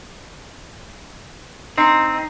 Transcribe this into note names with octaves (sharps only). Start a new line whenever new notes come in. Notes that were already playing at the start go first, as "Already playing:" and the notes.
C4 D#4